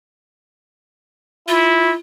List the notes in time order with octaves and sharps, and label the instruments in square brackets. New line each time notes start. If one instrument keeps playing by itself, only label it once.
[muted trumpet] E4 [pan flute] F4